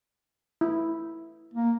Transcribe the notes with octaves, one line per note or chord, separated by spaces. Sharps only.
E4
A#3